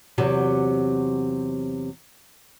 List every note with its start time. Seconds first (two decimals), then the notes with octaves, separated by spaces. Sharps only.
0.18 E2 C3 F#3